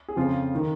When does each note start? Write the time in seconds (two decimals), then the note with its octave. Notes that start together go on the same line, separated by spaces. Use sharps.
0.08 G#4
0.16 F2 C#3 F3 F4
0.55 D#3